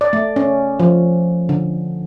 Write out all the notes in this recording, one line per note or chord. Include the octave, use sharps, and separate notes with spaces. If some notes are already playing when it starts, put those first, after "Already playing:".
D5
A3
C#4
F3
D3